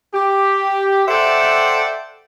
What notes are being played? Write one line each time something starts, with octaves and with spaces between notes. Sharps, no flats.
G4
A4 C5 D5 E5 F#5 G5